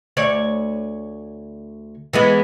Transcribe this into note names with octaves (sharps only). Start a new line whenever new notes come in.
D2 C#5 D5
E3 G#3 B3